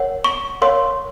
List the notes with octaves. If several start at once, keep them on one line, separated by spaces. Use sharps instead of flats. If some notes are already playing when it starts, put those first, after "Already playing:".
Already playing: A#4 C#5 F#5
C#6
A#4 C#5 F5 C6